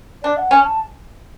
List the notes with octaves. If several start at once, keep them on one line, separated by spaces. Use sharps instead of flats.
D4 D5
F#5
C#4 G#5
A5